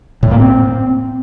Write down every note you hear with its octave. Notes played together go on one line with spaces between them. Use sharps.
A2
A#3
C4